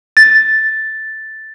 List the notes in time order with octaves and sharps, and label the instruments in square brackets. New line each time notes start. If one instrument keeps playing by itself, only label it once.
[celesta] A6